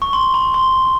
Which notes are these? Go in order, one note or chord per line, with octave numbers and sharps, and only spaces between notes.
C#6
C6
B5
C6